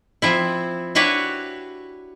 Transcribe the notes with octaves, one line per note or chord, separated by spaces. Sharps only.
F3 C4 E4
D4 E4 F#4 G4 B4 C#5